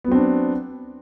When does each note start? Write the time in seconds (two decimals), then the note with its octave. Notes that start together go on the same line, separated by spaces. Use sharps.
0.04 B3
0.08 F#3
0.12 C4
0.15 D4